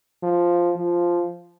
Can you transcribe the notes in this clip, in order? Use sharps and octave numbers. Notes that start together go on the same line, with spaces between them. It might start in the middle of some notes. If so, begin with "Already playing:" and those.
F3
F3